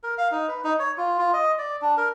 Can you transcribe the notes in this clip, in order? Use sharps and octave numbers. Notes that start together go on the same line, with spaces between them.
A#4
F5
D#4
B4
D#4
C#5
F4
F4
D#5
D5
D4
A#4